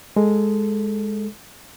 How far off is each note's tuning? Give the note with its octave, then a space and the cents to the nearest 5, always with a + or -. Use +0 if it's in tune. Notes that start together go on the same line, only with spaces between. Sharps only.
G#3 +0 A4 +0